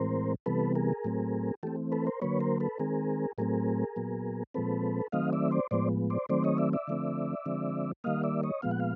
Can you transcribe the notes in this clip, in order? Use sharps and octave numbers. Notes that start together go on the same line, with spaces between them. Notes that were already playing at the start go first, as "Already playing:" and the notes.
Already playing: A2 E3 G#3 C4 A#4 C5
C3 E3 G3 B3 A4 B4
G#4 A#4
A2 F#3 A3 C4
E3 A3 C4 G4 A4
A4 B4
A#4 C5
D3 F#3 A#3 B4 C#5
A#4 C5
A4 B4
D#3 G#3 C4 G#4 A#4
A2 F#3 A3 C4 G#4 A#4
A#2 F#3 B3
A#2 F3 G#3 C4 A4 B4
D#3 F#3 A3 C4 D#5 F5
D5 E5
C5 D5
A2 F3 G#3 B3 C5 D5
C5 D5
D#3 F#3 A3 C4 C5 D5
C#5 D#5
D5 E5
D5 E5
D3 F3 A3 C4
D3 F3 G#3 C4
D#3 G3 A#3 D#5 F5
D5 E5
C#5 D#5
A#2 F3 G#3 B3 F5
F#5
F5